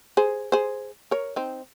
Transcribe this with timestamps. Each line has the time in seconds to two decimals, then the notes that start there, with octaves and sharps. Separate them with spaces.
0.17 G#4 C5
0.52 G#4 C5
1.11 A#4 C#5
1.36 C4 D#4